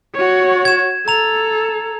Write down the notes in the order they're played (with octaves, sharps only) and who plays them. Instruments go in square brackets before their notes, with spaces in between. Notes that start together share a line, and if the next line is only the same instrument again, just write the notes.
[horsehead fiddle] F#4 C#5
[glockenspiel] G#6 E7
[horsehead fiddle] A4 [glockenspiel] A#5 F7